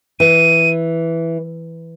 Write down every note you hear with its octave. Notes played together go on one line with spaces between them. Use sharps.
E3 D#7